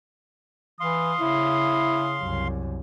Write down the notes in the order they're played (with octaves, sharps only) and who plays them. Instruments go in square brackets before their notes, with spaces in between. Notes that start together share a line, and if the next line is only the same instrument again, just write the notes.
[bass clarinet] E3 [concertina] F5 C6 [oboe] D#6
[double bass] C#3 [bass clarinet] E4
[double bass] C2 F#2